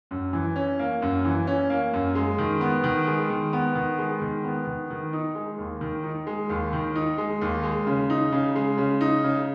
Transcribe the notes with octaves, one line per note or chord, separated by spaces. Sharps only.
F#2
E3
C#4
A#3
F#2
E3
C#4
A#3
F#2
G#3
D#3
B3
D#3
G#3
D#3
B3
D#3
G#3
D#3
B3
D#3
D#3
D#4
G#3
D#2
D#3
D#4
G#3
D#2
D#3
D#4
G#3
D#2
G#3
C#3
D#4
C#3
G#3
C#3
D#4
C#3